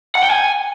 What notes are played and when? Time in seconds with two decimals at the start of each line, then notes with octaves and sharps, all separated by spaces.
0.15 F#5
0.23 G5
0.30 G#5